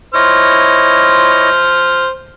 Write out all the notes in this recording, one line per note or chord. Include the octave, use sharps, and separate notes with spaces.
E4 C5 C#5 D#5 F6